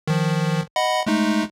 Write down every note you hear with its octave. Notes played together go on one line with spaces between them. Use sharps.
D#3 F3
D#5 F#5 B5
G#3 A3 D#4